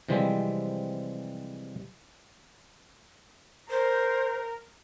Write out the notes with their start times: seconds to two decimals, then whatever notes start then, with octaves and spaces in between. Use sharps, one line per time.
0.09 C3 E3 F3 G3 G#3 C4
3.70 A#4 C5